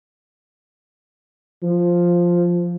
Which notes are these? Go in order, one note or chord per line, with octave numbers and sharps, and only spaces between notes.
F3